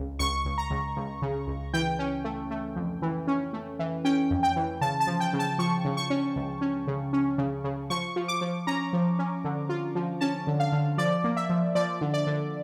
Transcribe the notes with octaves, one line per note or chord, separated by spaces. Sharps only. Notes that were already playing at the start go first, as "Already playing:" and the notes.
Already playing: C#2
C#2 C#6
C#2
A#5
C#2
C#2
C#3
C#2
E3 G5
C#4
A3
A3
F2
E3
C#4
A3
E3
C#4 G5
F2
G5
E3
C#3 A5
A5
F3
G5
C#3
A5
F3 C#6
C#3
C#6
C#4
C#2
C#4
C#3
C#4
C#3
C#3
F3 C#6
F3
D6
F3
C#4 A#5
F3
C#4
D3
F4
F3
C#4 A5
D3
F5
D3
F3 D5
A#3
E5
F3
F3 D5
D3
D5
D3